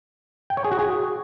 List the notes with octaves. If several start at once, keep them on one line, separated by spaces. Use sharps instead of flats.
G5
C#5
G#4
F#4
G#4